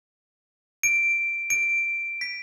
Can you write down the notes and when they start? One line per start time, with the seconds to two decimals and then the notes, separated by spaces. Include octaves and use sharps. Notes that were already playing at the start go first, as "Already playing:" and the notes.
0.83 D7
1.50 D7
2.21 B6